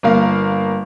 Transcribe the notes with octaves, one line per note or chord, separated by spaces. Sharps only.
G1 A#3 F5